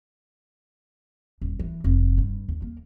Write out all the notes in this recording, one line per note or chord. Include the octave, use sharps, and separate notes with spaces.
D#1
E3
F1
G2
D#2
A#3